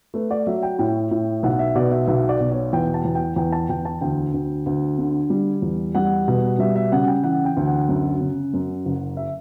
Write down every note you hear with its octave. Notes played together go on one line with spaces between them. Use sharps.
A3 B4
D5
F#3 E5
G5
A2 G5
A2
B1 F#5
E5
B2 D5
E5
B1 E5
D5
B2
C#5
E2 G5
A5
E2
G5
E2 G5
A5
E2 G5
A5
D2 G5
D2
D2
D3
G3
E2
G3 F#5
B2
G3 E5
E5
C#3 F#5
G5
E3 F#5
G5
D2
F#5
F#2
C#3
F#2
F#1
E5